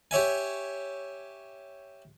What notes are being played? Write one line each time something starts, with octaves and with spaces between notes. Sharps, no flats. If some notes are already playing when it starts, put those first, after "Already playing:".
G4 C#5 E5 G#5